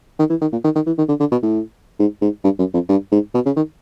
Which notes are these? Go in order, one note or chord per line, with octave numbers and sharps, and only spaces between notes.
D#3
E3
D#3
A#2
D#3
D#3
E3
D#3
D3
D3
B2
A2
G#2
G#2
G2
F#2
F2
G2
G#2
B2
C#3
D#3